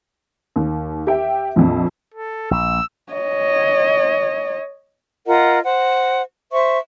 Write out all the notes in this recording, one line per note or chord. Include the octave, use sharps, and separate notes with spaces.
D#2
G4 E5 G5
A#1 F2
A4
A#1 E6
C#5 D#5
F4 A#4 D#5 F#5
C5 F#5
C5 E5 C#6